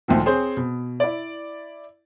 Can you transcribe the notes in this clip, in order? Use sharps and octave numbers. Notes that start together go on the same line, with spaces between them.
D2 A#2 D#3 F3
C4 G#4 C5 C#5
B2
E4 D5